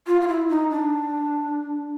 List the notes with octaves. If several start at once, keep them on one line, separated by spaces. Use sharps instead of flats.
F4
F4
E4
D#4
D4